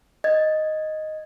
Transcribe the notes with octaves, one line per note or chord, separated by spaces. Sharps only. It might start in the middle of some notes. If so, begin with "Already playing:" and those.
D#5 G#6